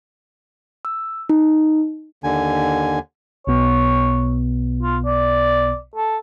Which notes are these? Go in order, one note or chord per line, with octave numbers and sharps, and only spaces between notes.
E6
D#4
D#2 D3 G#5
B1 B2 B3 C#5
F4
D5
A4